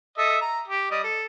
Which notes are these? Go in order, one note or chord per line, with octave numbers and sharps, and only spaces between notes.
A4 D#5 E5
A#5
G4
G3 D#5
A4